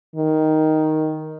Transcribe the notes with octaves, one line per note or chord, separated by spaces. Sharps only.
D#3